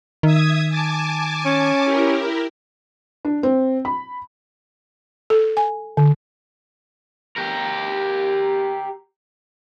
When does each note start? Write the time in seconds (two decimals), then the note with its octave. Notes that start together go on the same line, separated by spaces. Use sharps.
0.23 D#3 E5 D#6 G#6
0.70 G#5 A5 D6
1.45 C#4
1.84 E4 G4 A#4
3.25 D4
3.43 C4
3.85 B5
5.30 A4
5.57 G#5
5.97 D3
7.36 G4 A#4